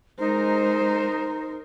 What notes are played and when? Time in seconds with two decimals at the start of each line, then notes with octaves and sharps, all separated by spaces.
0.20 G#3 D#4 A#4 C5